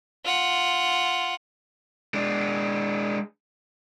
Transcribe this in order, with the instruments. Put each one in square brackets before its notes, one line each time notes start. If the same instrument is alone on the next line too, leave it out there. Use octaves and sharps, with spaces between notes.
[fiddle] F4 F#5
[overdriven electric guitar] G#3 D4